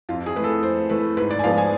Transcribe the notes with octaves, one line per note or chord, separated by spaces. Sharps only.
F2 F4
G#4
E3 A3 B4
A4
F2 C5
E3 A3 B4
G#2 B4
D5
G#5
F3 G#3 B3 F5
G#5